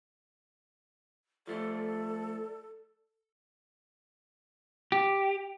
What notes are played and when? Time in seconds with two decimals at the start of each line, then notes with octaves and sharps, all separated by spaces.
1.47 F3 A3 A4 D5
4.92 G4